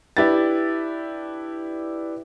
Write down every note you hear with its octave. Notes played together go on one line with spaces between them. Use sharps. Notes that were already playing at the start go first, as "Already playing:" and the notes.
D4 E4 G4 B4 A6